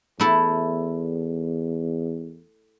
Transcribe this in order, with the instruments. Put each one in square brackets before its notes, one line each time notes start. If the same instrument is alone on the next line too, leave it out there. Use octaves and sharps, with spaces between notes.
[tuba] E2 [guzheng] A3 E4 A4